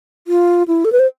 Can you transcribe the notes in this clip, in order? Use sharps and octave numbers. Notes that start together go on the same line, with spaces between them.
F4
E4
A4
B4
C5